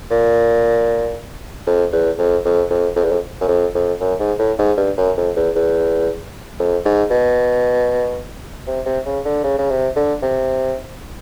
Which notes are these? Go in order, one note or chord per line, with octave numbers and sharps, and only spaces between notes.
A#2
F2
E2
F2
F2
F2
F2
E2
F2
F#2
F2
F2
F#2
G#2
A2
G#2
G2
F#2
F2
E2
E2
F2
G#2
B2
C3
C3
C#3
D3
C#3
C#3
C3
D3
C3